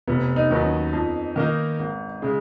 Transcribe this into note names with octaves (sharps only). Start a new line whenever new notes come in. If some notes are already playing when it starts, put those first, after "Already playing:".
F1 B3
D#4
D#2 D#3 F#3 B3
C#4
F2
D#3 A#3 D#4 A#4
G#1
C#3 G#3